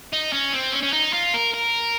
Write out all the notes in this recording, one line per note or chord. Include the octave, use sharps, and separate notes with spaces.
D#4
C#4
C4
C#4
C#4
D#4
F4
A#4
A#4